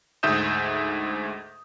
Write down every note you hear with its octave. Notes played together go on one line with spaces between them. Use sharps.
D2 G#2 E5 D#6 G6 E7